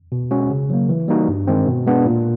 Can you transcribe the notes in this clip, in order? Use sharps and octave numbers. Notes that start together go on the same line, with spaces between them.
B2
G#3 C#4 F#4
C#3
F#3 A#3
E3
G3 A#3 D#4 F#4
G2
D#3 G#3 C4
B2
G#3 B3 D4
A#2